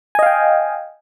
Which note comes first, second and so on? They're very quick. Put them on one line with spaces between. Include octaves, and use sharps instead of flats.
G#5 D#5 F5 G5